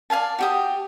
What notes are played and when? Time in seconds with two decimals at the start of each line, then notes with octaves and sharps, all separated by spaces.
0.10 D5 F5 G#5 A5
0.39 F#4 G4 D#6